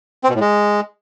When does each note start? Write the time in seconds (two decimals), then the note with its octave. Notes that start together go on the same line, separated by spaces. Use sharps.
0.24 C4
0.29 B2
0.35 A2
0.41 G#3